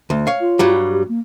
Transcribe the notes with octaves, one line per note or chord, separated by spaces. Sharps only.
D2
C#5 F5
F4
G2 F#3 G3
G4
A#3